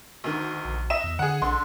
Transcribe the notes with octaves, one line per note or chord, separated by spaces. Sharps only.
D2 D#3
A#1
D#5 E5 E7
E2
D3 G#4 F#5
A#1 D3 C6